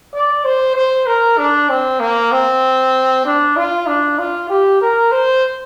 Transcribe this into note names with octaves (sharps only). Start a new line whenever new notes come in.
D5
C5
C5
A#4
D4
C4
A#3
C4
D4
F4
D4
F4
G4
A#4
C5